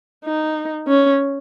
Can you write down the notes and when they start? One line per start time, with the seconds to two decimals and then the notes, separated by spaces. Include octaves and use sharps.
0.25 D#4
0.87 C#4